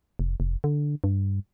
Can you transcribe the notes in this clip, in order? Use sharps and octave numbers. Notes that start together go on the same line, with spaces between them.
F1
F1
D3
G2